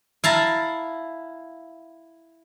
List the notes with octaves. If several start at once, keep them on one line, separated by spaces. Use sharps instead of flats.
E4 F5 A5 A#5